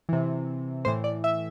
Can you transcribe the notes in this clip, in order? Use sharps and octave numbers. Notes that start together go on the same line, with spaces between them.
C3 E3
A2 E3 C5
D5
E5